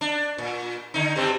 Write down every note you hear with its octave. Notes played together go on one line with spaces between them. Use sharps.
D4
A#2
D3 D#4
G2 G3 C4